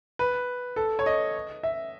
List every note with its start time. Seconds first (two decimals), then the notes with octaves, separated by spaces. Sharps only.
0.19 B4
0.76 A4
0.99 C#5
1.06 D#5
1.63 E5